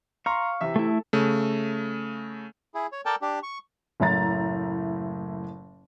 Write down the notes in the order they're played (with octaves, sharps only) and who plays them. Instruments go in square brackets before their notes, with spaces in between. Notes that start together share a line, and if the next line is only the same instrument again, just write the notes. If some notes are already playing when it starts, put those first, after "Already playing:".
[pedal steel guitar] F5 C#6 [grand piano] A#5 C6
[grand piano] C3 E3 E5
[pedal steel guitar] A3 E4
[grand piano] A4
[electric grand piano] C#3 A3
[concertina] E4 G#4
C#5
A4 A#4 D5 G5 A5
D4 G4
C#6
[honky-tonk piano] F#1 A2 E4 A#5 A6